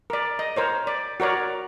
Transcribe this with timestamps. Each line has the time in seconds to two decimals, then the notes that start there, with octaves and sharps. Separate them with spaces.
0.10 A#4 D5
0.39 D#5
0.56 A#4 C5 C#5
0.87 D5
1.20 F#4 A#4 C#5 D5